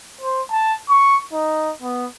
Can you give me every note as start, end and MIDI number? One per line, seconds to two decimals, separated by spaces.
0.21 0.41 72
0.51 0.75 81
0.89 1.20 85
1.33 1.72 63
1.82 2.05 59